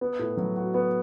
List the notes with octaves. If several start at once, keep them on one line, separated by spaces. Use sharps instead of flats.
B3
A2
F#3
F#4
B3